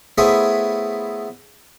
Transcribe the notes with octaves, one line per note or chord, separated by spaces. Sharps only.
A3 B3 E4 G#4 C5 C#5